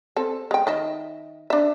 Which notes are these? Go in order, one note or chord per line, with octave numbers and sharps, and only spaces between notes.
C4 A4
G#3 G5
D#3 D#5 E5
D4 E5